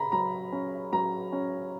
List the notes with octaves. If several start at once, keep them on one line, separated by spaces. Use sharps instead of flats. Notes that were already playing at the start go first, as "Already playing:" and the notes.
Already playing: C#3 A#5 B5
F#3 A#5
C#4
F#3 A#5
C#4